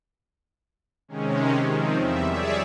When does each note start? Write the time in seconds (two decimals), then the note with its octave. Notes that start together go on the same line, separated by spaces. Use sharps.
1.08 C3 D#3 G#3 C#4
1.67 D#3 F3 C4
1.98 E2 G3 E5
2.30 G#4 C#5 D5 E5